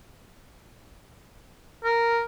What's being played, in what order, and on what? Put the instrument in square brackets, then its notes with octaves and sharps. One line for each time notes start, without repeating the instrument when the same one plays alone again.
[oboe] A#4